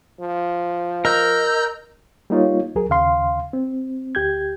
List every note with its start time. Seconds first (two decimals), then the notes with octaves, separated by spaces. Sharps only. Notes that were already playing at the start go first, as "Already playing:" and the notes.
0.20 F3
1.05 A#4 D#5 E6 G6
2.30 G3 A#3 D#4 F4 C#5
2.75 C#2 F#3 G#4 A#4
2.90 D#2 C#3 F5 C6
3.53 C4
4.15 D2 G4 G6 G#6